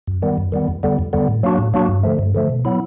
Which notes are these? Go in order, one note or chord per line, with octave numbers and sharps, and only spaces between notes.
F#2
D#3 G3 B3
F#2
D#3 G3 B3
F2
D3 G3 B3
F2
D3 G3 B3
A2
F#3 A#3 D4 F#4
A2
F#3 A#3 D4 F#4
G2
D3 F3 A3
G2
D3 F3 A3
B2
F#3 B3 E4